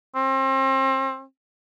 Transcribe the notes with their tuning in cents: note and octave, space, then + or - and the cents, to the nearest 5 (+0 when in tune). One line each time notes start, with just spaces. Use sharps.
C4 +35